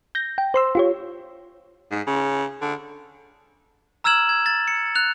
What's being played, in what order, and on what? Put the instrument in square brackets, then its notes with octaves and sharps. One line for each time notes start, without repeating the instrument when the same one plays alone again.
[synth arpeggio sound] G6 A#6
G5
C5 C6 E6
F4 G4 C#5
[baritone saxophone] G#2
C#3
D3
[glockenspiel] A#5 E6 F6 G#6 E7 F#7
G#6
A6
C#7
F#6 F7